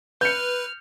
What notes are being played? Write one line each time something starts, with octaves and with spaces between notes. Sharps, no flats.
B4 F6 G6 C#7